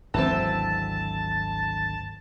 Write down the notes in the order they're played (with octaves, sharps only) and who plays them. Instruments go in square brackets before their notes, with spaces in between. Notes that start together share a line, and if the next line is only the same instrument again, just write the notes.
[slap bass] G#1 D2 F#3 [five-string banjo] E3 C4 [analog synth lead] A5